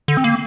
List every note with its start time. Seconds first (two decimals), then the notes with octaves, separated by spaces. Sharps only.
0.08 D3
0.17 C4
0.24 A#3